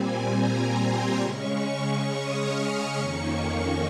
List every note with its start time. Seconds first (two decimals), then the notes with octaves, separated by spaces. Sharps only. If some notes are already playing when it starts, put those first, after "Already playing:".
Already playing: A#2 G3 C4 G#5
0.30 A#5
0.75 C6
1.20 C#3 G#3 C#4 C#6
1.64 C#6
2.08 D#6
2.38 F6
2.69 D#6
2.98 F2 D#3 A#3 C#4 C#6